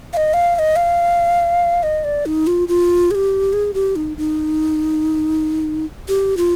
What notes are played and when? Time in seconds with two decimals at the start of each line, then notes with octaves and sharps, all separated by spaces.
0.13 F5
0.17 D#5
0.34 F5
0.55 F5
0.59 D#5
0.76 F5
1.83 D#5
2.04 D5
2.26 D#4
2.47 F4
2.68 F4
3.11 G#4
3.15 G4
3.53 G#4
3.74 G4
3.96 D#4
4.17 D#4
6.08 G4
6.37 F4